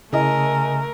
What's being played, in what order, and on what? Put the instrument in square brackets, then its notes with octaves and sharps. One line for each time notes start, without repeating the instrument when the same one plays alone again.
[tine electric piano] C#3 [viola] A3 A#4 [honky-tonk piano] E4 D#5 [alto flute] G#5